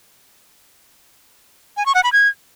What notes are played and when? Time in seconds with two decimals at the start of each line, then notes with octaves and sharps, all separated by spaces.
1.77 G#5
1.86 C#6
1.95 F#5
2.04 B5
2.13 G#6